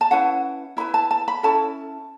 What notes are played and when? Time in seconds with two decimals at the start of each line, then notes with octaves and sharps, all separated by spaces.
0.01 A5
0.11 C#4 E4 B4 F#5
0.77 E4 B4 B5
0.94 A5
1.11 A5
1.28 B5
1.43 C#4 E4 A4 A5